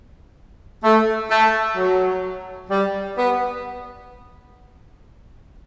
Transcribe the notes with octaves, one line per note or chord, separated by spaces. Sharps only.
A3
A3
F#3
G3
B3